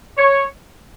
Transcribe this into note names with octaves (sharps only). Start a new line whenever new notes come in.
C#5